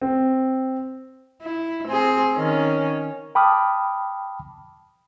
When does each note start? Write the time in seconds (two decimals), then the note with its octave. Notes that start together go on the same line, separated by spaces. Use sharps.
0.02 C4
1.42 E4
1.88 C4 G#4
2.36 D#3 C#4
3.35 G5 A5 B5 D6 D#6 F6